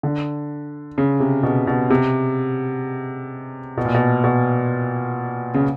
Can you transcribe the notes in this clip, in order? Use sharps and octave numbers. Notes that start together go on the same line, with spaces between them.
D3
C#3
C3
B2
B2
C3
B2
A#2
B2
B2
C#3